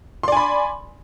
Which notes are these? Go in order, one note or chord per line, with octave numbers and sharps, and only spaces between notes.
D5 G#5 B5 C6